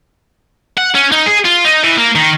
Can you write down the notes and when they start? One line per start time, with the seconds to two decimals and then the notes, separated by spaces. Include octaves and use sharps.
0.77 F#5
0.95 C#4
1.12 D#4
1.26 G#4
1.45 F4
1.65 D#4
1.84 E3
1.98 A#3
2.15 D#3